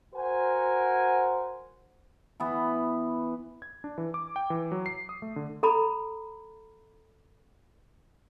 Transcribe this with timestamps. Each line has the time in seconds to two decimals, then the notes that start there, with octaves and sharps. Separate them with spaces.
0.15 F#4 A#4 C5 F#5 G#5
2.40 E3 B3
3.62 G#6
3.84 D4
3.98 E3
4.14 D6
4.36 G5
4.50 E3
4.72 F#3
4.86 C7
5.09 D#6
5.22 A3
5.36 D3
5.63 A4 A#5 B5